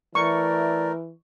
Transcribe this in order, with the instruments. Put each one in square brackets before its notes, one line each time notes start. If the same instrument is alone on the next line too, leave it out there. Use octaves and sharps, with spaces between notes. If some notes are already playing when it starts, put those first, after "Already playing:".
[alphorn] E3 [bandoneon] A3 A#4 [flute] D5 [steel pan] C#6